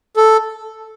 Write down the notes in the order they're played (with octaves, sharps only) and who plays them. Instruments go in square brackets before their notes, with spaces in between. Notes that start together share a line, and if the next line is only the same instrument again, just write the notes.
[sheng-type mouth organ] A4